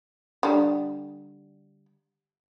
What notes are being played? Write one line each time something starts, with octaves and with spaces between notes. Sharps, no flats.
D3 G3